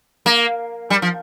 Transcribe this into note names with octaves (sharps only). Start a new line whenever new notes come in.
A#3
G3
F3